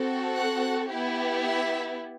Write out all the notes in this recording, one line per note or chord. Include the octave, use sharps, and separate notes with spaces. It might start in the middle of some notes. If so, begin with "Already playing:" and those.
Already playing: C4 F#4 A4
F#5
B3 E4 G4
E5